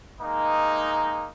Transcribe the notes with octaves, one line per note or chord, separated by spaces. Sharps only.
G#3 A#3 D#4